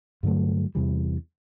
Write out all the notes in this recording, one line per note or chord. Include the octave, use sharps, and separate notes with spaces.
G2 D3 F#3 A3
E2 C3 E3 G3